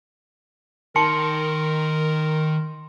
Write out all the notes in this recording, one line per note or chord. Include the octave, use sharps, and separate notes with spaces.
D#3 A#4 A5 C6 C#7